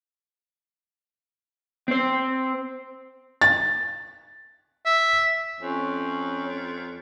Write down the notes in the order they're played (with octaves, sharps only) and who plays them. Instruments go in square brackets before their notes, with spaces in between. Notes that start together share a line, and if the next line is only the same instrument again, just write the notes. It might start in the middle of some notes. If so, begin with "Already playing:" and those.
[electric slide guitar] C4 C5
[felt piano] A6
[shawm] E5
[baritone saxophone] F2 [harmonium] C#4